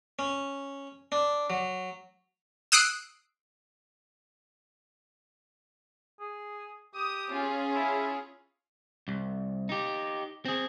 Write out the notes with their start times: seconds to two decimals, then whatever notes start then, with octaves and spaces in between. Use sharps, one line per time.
0.19 C#4
1.12 D4
1.50 F#3
2.72 D#6 E6 F#6 C7 D7
6.20 G#4
6.95 G4 D#6
7.30 C#4 F4 G#4
7.75 E4
9.08 C2
9.69 D#4 G4
10.45 C4 G#4